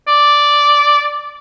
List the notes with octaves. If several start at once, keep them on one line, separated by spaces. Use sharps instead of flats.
D5